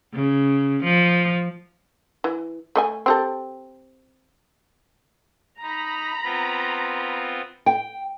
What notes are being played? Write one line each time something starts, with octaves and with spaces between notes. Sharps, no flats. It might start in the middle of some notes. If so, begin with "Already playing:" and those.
C#3
F3
E3
A3 D#5 G#5
C4 G4 A4
D#4 A#5 B5
B3 C4 F4
G5